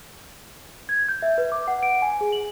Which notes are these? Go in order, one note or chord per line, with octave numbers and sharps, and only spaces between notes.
G#6
G6
E5
B4
D6
F#5
D7
G#5
G#4
F#7